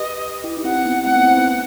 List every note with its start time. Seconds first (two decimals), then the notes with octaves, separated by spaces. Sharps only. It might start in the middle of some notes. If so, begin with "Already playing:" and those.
Already playing: G4 B4 D#5
0.44 E4 G4
0.57 D#4
0.64 C4 E4 F#5
0.85 B3 D#4
1.06 A3 C4 F#5
1.16 B3 D#4
1.27 C4 E4
1.37 B3 D#4